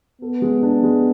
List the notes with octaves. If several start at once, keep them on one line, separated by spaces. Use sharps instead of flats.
B3 A4
G#3
D4
G#3